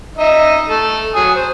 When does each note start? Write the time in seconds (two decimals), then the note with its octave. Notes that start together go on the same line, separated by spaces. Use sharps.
0.18 D#4 D#5 E5
0.69 A3 A4
1.15 F#3 G#5 D#6
1.35 C5